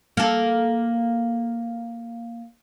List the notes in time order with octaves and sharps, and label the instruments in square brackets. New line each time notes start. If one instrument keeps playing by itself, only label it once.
[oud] A#3 A4